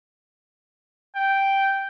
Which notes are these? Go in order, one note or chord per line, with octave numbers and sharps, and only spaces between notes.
G5